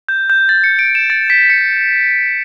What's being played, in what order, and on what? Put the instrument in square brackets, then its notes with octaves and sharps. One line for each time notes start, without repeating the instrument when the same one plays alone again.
[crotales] G6
G6
A6
C#7
D7
E7
A6
B6
C#7